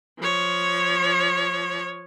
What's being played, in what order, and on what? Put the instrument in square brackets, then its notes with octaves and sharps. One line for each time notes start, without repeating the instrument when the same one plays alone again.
[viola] F3 C#5